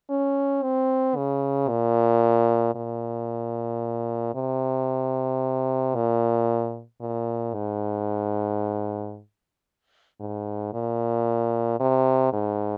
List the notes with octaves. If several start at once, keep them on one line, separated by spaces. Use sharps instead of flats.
C#4
C4
C#3
A#2
A#2
C3
A#2
A#2
G#2
G#2
A#2
C3
G#2